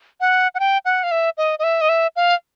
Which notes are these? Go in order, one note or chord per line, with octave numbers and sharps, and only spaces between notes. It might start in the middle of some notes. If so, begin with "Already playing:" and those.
F#5
F#5
G5
F#5
F5
E5
D#5
D#5
E5
D#5
E5
F5